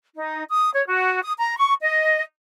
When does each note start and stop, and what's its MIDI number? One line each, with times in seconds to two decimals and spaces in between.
0.16 0.44 63
0.50 0.71 87
0.74 0.83 73
0.87 1.22 66
1.23 1.34 87
1.38 1.58 82
1.58 1.74 85
1.83 2.22 75